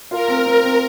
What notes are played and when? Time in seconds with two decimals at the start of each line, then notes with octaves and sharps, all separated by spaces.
0.11 F4 A#4
0.28 C4
0.46 C4
0.64 C4